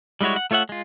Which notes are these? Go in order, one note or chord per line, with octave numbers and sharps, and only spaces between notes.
G3 G#3 E4 F#4 C#5
F#5
A3 F4 C#5 E5 F#5
G#3 F4